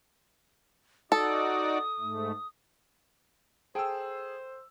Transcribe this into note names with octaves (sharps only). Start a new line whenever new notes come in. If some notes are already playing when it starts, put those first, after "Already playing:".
D#4 F#4 A4 D5 D#6
G#2 A3
G#4 A4 C5 G5 A5 E6